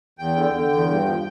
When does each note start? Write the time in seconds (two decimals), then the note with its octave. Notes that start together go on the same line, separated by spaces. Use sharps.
0.18 E2 G5
0.36 D3
0.53 D3
0.71 E2
0.88 G2
1.05 F3